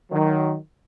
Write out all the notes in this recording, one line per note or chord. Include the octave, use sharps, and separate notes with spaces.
D#3 F#3